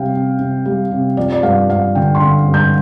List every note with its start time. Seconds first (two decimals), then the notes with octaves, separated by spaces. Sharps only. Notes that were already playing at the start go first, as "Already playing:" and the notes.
Already playing: C3 G3 F5 G5
0.13 C3
0.39 C3
0.65 G3
0.91 C3
1.17 F3 D5
1.32 D5
1.42 G2 F5
1.69 G2 F5
1.95 D3 G5
2.15 C6
2.21 D3
2.47 G2
2.54 G6